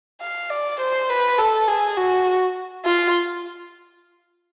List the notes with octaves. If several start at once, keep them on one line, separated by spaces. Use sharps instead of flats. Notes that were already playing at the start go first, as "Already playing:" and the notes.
F5
D5
C5
B4
A4
G#4
F#4
F4